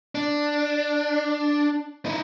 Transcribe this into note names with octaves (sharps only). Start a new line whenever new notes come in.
D4
D#4 E4